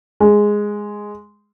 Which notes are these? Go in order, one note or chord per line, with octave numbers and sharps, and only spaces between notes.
G#3